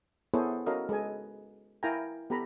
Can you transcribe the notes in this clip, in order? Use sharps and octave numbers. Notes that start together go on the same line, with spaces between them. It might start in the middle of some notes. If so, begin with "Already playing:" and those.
B3 E4 G#4 A4 C5 C#5
C#4 F#4 A4 A#4 D#5 F5
G#3 A4 B4 D#5 G#5
E4 A#4 F5 G5 G#5 A#5
B3 G4 A4 A#5 B5